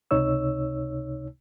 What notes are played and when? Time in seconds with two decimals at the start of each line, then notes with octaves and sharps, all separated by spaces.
0.11 C#2 C3 D#4 C#5 E6